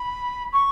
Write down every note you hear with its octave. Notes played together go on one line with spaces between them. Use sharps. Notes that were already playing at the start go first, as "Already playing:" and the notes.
Already playing: B5
C#6